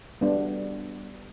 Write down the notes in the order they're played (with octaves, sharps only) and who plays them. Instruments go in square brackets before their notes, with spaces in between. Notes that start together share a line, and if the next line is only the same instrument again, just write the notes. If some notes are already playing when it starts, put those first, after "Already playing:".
[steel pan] G3 B3 D4